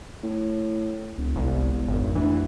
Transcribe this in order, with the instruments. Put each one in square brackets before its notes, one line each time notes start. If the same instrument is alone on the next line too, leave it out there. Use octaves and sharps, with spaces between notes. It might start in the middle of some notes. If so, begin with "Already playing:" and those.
[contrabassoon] A2
[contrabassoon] E1 [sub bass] C#2
[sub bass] G1 [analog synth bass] C2
[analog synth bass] G#1 [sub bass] F2
[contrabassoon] D2 [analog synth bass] E3